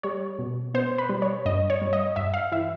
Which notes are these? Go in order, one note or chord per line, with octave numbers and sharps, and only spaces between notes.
G3 C#5
B2
B2 C5
B4
G3
C#5
G2 D#5
C#5
G3
D#5
G2 E5
F5
E3 E5